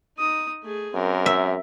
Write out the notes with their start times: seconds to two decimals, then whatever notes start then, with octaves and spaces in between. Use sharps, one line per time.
0.18 D#4 D#6
0.63 A3 G#4
0.94 F#2 C4 A#4
1.26 E5